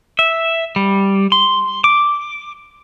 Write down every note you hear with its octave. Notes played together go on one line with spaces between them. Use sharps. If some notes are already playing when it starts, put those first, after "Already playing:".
E5
G3
C6
D6